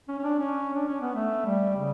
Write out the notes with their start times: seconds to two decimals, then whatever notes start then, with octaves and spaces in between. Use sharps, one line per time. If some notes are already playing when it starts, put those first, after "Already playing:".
0.08 C#4
0.19 C#4
0.24 D4
0.39 C#4
0.74 D4
0.88 C#4
1.01 B3
1.15 A3
1.45 G3
1.76 C#3